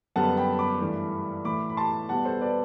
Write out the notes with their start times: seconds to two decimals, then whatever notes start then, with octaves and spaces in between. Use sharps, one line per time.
0.16 F#2 D3 G3 B3 F#5 A5
0.37 G5 B5
0.59 B5 D6
0.80 G2 E3 A3
1.45 A2 E3 A3 B5 D6
1.70 B5
1.77 A5 C6
2.09 B2 G3 B3 F#5 A5
2.25 A4 C5
2.41 B4 D5